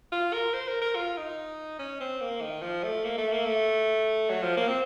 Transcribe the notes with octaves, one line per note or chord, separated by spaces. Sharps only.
F4
A#4
C5
A#4
A#4
F4
D#4
C#4
C4
A#3
D#3
F3
A3
A#3
A3
A#3
A3
F#3
F3
A#3
C4